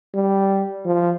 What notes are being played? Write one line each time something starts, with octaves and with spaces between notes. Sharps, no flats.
G3
F3